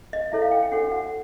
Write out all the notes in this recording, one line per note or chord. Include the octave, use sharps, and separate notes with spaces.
D#5
E4 A4 C#5 E5
F5
G5
G5
D4 F#4 A4 C#5 F#5
F#5